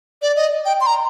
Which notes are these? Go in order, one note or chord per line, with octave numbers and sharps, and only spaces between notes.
D5
D#5
G5
C6
A#5